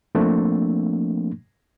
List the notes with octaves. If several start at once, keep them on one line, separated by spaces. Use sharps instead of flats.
F3 A3 A#3 C4 D4